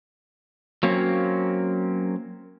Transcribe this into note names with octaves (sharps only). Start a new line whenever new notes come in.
F#3 A#3 C4 C#4